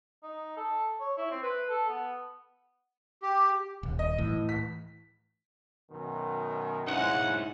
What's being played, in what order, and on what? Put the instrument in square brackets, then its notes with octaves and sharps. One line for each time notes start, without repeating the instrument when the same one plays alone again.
[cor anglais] D#4
A4
C#5
E4
C4
B4
A4
B3
[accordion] G4
[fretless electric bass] D#1
[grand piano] D#5
[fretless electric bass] A2 E3
[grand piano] B6
[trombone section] F#2 B2 D#3
[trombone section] C#2 C#3 C5 [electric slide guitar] D#4 E4 G#4 [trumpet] F#5